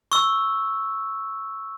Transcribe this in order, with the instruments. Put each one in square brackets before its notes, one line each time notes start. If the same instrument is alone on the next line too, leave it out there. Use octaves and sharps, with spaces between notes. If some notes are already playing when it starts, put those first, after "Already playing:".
[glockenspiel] C#6 E6